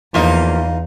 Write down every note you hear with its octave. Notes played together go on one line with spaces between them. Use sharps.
E2 F3 A#3 D#4 F4 F5